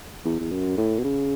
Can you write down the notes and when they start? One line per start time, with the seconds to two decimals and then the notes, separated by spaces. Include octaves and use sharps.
0.25 E2
0.40 E2
0.51 F#2
0.77 A2
0.99 B2
1.04 C#3